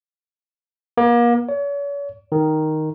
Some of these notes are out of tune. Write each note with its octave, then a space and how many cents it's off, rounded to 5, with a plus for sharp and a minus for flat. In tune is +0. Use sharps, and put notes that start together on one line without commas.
A#3 +35
C#5 +40
D#3 +0